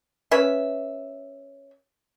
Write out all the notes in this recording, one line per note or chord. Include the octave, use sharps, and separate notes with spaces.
C#4 B4 E5